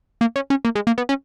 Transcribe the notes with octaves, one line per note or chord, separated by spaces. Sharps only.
A#3
C#4
C#4
A#3
G#3
A#3
B3
C#4